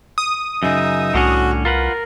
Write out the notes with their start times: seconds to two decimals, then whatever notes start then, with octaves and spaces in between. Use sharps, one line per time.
0.18 D#6
0.63 F#2 C#3 D#4 E5
1.14 C2 A2 D3 C#4 F#4
1.65 F4 A#4 B4 F#5